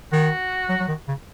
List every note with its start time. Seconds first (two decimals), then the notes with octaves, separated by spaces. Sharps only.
0.13 D#3 F#4
0.69 F#3
0.80 F#3
0.88 D#3
1.08 C#3